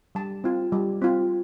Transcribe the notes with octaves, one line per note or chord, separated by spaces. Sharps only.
G3 A5
C4 F4
G3
C4 F4